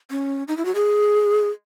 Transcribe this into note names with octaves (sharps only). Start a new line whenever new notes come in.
C#4
D#4
E4
F#4
G#4